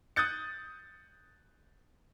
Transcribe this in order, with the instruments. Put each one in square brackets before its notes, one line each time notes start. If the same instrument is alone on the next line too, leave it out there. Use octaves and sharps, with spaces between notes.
[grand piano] D#6 F#6 G6 A6 C#7